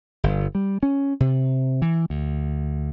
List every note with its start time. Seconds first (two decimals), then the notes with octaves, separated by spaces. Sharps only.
0.24 G1
0.55 G3
0.83 C#4
1.20 C3
1.82 E3
2.10 D2